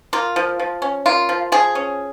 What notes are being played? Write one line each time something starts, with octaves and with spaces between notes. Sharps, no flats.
A#3 F4
F3
F3
C#4
A#3 F4
F3
F3 G#4
C#4